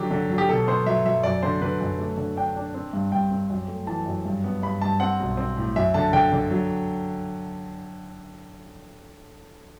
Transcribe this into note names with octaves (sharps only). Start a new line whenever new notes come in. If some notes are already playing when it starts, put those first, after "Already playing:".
Already playing: D3 F#3 G4
D3
F#3
G4
B2 A4
B3 C5
F#3 E5
F#3 E5
F#2 D5
D3 C5
D3 B4
F#2
A3
D3
D4 G5
D4
C4
G2
G2 G5
C4
F#2
A3
E3 A5
F#2
G2
B3
G2 B5
G2 A5
C4 F#5
B1
C4
A2
F#2 E5
D3 A5
D3 G5
D3
F#3